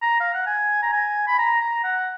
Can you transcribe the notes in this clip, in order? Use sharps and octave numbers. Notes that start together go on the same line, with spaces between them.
A#5
F5
F#5
G#5
A#5
G#5
B5
A#5
A#5
F#5